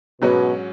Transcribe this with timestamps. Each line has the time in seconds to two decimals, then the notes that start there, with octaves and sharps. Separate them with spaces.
0.22 G#2 B2 F#3 C#4 F#4